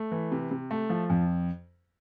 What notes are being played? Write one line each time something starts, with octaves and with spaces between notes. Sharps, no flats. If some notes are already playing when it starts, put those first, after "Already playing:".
Already playing: A3
E3
C3
C3
A3
F3
F2